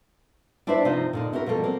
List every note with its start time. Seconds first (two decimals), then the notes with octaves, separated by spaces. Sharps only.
0.67 D4 E4 B4 C5 D5 E5
0.85 C3 F3 D#4 F4 C5
1.13 A#2 D3 D#4
1.33 C4 E4 F#4 A4 A#4
1.46 B2 F3 G3 A4 A#4
1.64 A#3 C4